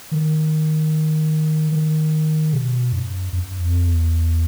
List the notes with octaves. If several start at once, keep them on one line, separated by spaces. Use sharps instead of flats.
D#3
D#3
B2
F#2
F#2
F2
E2